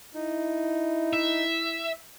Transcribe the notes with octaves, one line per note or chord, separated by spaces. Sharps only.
D#4 E4
E5